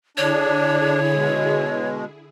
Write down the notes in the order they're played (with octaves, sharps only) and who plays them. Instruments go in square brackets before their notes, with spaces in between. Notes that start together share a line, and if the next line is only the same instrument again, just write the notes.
[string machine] D3 E4 G#4 [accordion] D4 [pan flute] C#5
[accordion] B2 G#3